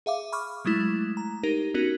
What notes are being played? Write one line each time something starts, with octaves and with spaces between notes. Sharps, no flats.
G#4 E5 F5 D6
B5 C#6 D6 F6
F#3 G#3 A3 E4
A#5
D#4 G4 A#4
B3 C#4 D#4 F#4 A#4